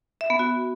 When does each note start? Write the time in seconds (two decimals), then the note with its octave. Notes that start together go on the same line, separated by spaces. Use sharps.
0.21 E5
0.30 B3
0.39 F#4